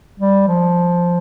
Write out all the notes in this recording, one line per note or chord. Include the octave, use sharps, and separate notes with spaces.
G3
F3